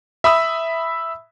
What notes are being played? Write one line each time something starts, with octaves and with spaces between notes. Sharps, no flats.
E5 B5 D#6 E6